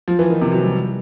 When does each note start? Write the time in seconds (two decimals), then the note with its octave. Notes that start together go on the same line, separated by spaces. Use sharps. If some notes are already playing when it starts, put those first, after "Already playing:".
0.08 F3
0.19 E3
0.30 D#3
0.41 C3
0.52 F#3
0.64 G3